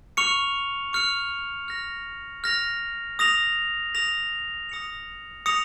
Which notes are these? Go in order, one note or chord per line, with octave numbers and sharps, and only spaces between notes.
C#6 F6 C#7 F7
C#6 F6 C#7 F7
F6 A#6 F7
F6 A#6 F7
D#6 A#6 F7
D#6 A#6 F7
D#6 A#6 C#7 F7
D#6 A#6 C#7 F7